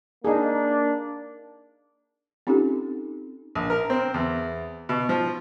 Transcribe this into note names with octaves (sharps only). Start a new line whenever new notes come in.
A#3 D4 D#4 G#4
C4 C#4 D#4 F4 G4 A4
A#1
A#4
C4
E2
B2
F3